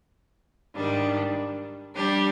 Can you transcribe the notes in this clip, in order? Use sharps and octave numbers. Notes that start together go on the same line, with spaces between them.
G#2 D#3 G3 D4
G3 D4 G4